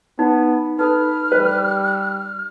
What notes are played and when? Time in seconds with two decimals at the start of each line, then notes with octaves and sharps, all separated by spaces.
0.19 B3 D#4
0.79 D#4 A4 B4 F6
1.32 G3 B4